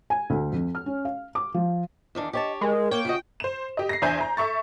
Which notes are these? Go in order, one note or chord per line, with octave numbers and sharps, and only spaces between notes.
G#5
D2
F2
F6
C#4
F5
D6
F3
E2 D#3 D4
G4 C#5 D#5 A5
G#3 A#4
A#3 C#5 G5
C#3 F4 F#4 D#5
C5 E7
G4 D#5
A#6 C7
E2 D4 C5 E5 G#5 G6
A#5
A4 E5 C#6 A6